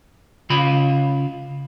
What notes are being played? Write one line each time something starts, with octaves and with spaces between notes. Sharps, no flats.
C#3 F4 B5